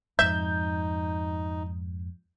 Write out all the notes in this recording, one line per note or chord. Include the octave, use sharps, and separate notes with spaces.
F2 G#2 D#4 E5 G6